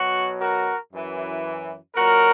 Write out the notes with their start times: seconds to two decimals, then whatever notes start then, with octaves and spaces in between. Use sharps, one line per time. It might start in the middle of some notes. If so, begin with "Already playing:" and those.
Already playing: B2 F#3 F#4
0.40 F#4 A#4
0.92 F#2 E3
1.96 A#2 F#3 F#4 A#4